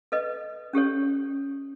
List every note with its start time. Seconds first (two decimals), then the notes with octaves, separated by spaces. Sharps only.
0.12 A4 B4 D#5
0.73 C#4 G4 A4 C#5